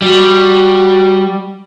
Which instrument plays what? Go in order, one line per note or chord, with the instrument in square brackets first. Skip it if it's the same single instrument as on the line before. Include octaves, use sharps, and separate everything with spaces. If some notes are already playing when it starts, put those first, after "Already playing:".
[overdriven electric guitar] G3 [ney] F#4